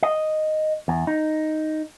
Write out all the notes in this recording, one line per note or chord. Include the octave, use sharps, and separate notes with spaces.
D#5
E2
D#4